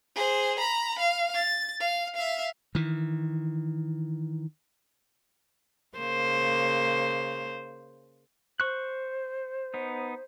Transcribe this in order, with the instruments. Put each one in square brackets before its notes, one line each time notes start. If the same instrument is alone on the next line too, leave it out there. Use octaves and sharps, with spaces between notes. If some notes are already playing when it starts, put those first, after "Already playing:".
[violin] G#4 C5
A#5 B5
F5
A6
F5
E5 F5
[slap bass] D#3 E3
[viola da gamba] C#3 A#3 C5
[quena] C5 [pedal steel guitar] C#6 F#6
[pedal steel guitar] B3 D#4